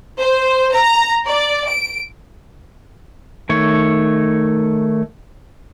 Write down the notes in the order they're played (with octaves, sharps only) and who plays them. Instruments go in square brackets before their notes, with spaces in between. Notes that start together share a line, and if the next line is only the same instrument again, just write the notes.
[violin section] C5
A#5
D5
D7
[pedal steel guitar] D#3 A3 C#5